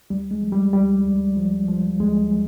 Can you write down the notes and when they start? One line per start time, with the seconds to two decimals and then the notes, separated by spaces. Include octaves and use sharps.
0.10 D2 G3
0.31 G#3
0.42 F3
0.52 G3
0.73 D2 G3
1.05 D2
1.37 F3
1.68 F3
2.00 D2 G#3
2.32 F3